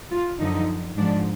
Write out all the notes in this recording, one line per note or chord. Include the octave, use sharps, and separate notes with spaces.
F4
F#2 D3 F3 D#4
G#2 F3 G#3 D4